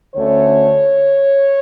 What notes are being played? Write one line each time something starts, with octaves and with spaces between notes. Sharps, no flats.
D2 D3 A3 C#4 C#5